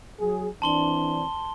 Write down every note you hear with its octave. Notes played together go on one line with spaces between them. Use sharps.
F#3 G#4
E3 C4 D4 A5 C6 G7